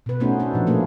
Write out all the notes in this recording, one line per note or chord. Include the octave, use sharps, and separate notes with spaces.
B2 B4
A3 B3 C#4 D#4 F#4 C5
D4 A4
A#2 F3
A3 A#3 G#4